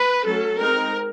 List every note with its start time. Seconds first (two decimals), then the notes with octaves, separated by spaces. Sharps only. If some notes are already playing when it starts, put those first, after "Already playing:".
Already playing: B4
0.25 F#3 A3 C#4 A4
0.59 G#3 C4 D#4 A#4